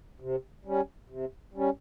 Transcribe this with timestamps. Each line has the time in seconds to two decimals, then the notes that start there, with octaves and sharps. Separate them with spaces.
0.20 C3
0.65 G3 C#4
1.10 C3
1.54 G3 C#4